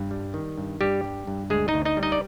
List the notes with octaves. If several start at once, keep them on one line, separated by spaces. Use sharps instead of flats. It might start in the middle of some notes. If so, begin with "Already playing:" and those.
Already playing: G2
G3
D#3
G2
G2 G3 G4
G3
G2
D2 G#3 G#4
D#4 D#5
D2
D#4 D#5
G3
D#4 D#5
D5